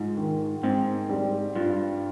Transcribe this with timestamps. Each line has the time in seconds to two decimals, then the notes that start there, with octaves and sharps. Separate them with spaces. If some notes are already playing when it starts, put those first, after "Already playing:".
Already playing: G#2 F4
0.17 D#3
0.63 G#2 C4
1.09 G3
1.55 G2 F4